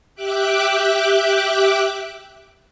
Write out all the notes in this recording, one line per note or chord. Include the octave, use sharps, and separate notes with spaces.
G4 E5 G5 D6 F#6